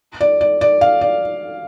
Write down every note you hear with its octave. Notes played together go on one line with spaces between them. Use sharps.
D5
D5
D5
F5
D5